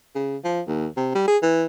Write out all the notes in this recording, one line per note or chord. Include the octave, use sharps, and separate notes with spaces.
C#3
F3
D#2
C3
G3
G#4
E3